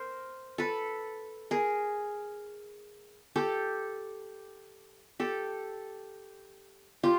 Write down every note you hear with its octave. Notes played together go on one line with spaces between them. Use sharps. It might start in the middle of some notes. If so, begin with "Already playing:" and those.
Already playing: A#4 C5
A4 B4
G#4 A#4
G4 A4
G4 A4
F4 G4